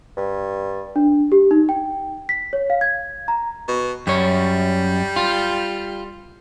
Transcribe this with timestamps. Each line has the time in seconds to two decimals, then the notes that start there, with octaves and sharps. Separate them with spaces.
0.17 G2
0.96 D4
1.32 G4
1.51 D#4
1.69 G5
2.29 B6
2.53 C#5
2.70 F5
2.81 G#6
3.28 A#5
3.68 B2
4.07 F#2 G3 C#5
5.16 F4